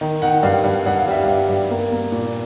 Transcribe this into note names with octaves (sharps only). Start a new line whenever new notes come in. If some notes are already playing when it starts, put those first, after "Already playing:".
D#3
D#3 F#5
G2 F5
G2
G2 F#5
F5
G3 E5
G2 F5
G2
A#3
A#3
A#2